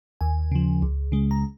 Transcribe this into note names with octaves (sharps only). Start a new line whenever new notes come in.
D#2 G#5
C#3 F3
C#2
C#3 G#3
A#5